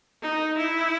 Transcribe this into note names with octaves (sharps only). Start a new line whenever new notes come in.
D#4
E4